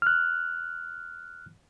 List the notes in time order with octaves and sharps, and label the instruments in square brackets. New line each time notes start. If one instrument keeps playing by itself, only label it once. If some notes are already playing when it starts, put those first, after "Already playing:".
[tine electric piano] F6 F#6